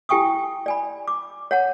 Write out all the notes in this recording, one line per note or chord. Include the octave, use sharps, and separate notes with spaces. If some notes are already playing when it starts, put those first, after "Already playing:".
E4 G4 G5 G#5 C#6 D#6
D5 G#5 B5
D6
C#5 F#5 A5